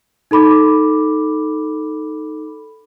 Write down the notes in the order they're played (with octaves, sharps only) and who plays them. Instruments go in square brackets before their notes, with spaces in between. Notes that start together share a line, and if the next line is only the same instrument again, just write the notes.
[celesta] D#4 A4 B5 D6